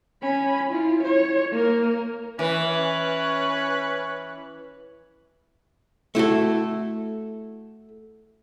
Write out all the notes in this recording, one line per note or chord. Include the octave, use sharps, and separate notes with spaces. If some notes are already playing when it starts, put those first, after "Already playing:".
C#4 B5
E4 F4
C#5
A#3 A#4
E3 C#4 B4 C#5
A3 E4 F#4 A4